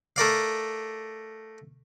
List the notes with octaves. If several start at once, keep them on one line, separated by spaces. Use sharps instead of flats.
A3 A#4 D5 F5